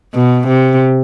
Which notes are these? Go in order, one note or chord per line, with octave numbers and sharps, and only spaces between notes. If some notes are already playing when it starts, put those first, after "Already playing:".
B2
C3